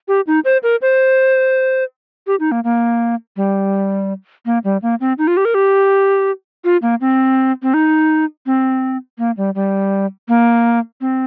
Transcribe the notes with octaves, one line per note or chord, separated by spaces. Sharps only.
G4
D#4
C5
A#4
C5
G4
D#4
A#3
A#3
G3
A#3
G3
A#3
C4
D#4
F4
G4
A#4
G4
F4
A#3
C4
C4
D#4
C4
A#3
G3
G3
A#3
C4